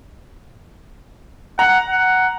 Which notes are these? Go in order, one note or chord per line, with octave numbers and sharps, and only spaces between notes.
F#5 A#5
F#5